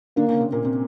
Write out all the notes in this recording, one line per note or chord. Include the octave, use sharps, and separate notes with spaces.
D3 A#3 D4
C#3 C#4
C3 C4
A#2 A#3
C3 C4